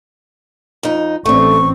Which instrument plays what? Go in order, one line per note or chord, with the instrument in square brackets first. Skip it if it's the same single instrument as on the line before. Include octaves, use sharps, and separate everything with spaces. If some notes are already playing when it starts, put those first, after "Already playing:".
[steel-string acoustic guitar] F2 D#4
[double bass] A1 C4 [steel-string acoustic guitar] A3 D4 [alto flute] C#6